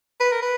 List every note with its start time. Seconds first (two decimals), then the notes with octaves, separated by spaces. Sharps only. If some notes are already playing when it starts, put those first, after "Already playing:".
0.20 B4
0.32 A#4
0.42 B4